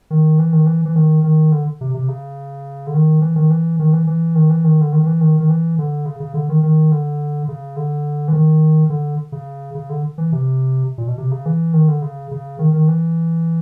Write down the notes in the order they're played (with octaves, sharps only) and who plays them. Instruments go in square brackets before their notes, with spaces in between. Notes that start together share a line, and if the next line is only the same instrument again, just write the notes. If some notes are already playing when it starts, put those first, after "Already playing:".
[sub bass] D#3
E3
D#3
E3
E3
D#3
D#3
D3
C3
C3
C#3
D3
D#3
E3
D#3
E3
D#3
E3
E3
D#3
E3
D#3
D3
D#3
D#3
E3
D#3
D#3
E3
D3
C#3
C#3
D3
D#3
D#3
D3
C#3
D3
E3
D#3
D3
C#3
C#3
D3
E3
C3
A#2
B2
C3
C#3
E3
D#3
D3
C#3
C#3
D#3
D#3
E3